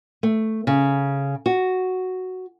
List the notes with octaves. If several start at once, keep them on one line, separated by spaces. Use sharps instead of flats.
A3
C#3
F#4